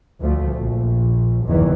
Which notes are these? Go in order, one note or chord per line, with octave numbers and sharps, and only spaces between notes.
D2 F3 A3
A#1
F#1 E2 G2 D#3 E3